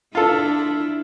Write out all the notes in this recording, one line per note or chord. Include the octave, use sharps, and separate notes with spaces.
D4 E4 F4 A4